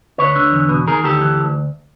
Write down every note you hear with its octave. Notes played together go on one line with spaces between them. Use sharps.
D2 B4 C#5
D3
E2
B2
D#3 G#4 A#4
D2 G4 A4
E3
D2